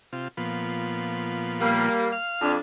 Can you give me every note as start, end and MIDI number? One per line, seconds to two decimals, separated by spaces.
0.13 0.28 48
0.13 0.28 65
0.37 1.89 46
0.37 1.89 53
0.37 1.89 59
1.61 2.12 55
1.61 2.12 58
2.12 2.52 77
2.12 2.52 89
2.42 2.57 41
2.42 2.57 62